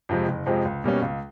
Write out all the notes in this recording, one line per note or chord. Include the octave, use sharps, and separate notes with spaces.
F2 C3 F3 G#3
F#1
F2 C3 F3 G#3
C#2
B2 G3 A#3 C#4
C#2